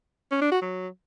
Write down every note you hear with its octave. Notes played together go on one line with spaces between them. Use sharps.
C#4
D4
F#4
F#3